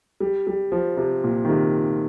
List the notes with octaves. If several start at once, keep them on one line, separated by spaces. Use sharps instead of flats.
G3
G3
F3
C3
A#2
D#3
C3